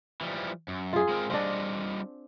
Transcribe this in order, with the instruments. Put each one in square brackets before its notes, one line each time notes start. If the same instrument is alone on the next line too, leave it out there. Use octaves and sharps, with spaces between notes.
[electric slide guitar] E3 F3 G3
F#2
[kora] F4 G#4
[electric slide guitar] G#3 C4 A#4
[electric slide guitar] G3 F4 D#5 [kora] C4 D4